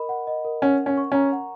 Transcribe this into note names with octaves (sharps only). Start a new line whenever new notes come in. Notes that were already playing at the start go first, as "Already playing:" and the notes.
Already playing: A#4 D#5 B5
F#5
D#5
A#4
C#4 F#5
C#5
C#4
C#6
C#4 A#5
F#5